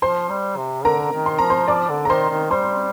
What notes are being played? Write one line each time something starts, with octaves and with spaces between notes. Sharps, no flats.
F3 C5 C6
G3
C3
D3 A#4 A#5
D#3
C6
F3 A#5
C5 C6
F3 D5 D6
D3
A#5
D#3 C5 C6
D#3
G3 C5 C6